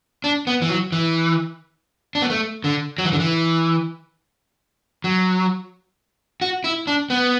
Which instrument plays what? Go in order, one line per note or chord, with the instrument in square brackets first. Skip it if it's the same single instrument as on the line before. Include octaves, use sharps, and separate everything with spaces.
[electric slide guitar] D4
B3
E3
F#3
E3
D4
B3
A3
D3
F#3
E3
D3
E3
F#3
F#4
E4
D4
B3